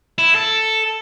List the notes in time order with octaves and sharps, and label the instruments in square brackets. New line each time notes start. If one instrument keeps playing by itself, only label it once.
[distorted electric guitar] E4
A4